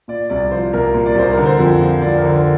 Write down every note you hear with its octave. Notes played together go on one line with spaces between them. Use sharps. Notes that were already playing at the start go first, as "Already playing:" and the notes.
A#2 D5
C2 D5
F3 C5
C2 A#4
A#2
D5
C2 C5
D3 A#4
C5
F2
F3
F2 D5
A#4
D3
A#4